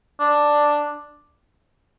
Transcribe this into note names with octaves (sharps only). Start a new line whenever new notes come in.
D4